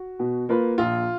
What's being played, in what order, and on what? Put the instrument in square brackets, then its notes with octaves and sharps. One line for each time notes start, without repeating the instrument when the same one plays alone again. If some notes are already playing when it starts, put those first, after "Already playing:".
Already playing: [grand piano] F#4
[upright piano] B2
A#3 F4 B4
[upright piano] A#1 [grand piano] F4